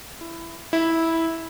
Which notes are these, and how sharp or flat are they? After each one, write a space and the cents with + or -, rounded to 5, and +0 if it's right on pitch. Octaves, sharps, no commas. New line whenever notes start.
E4 +15
E4 -10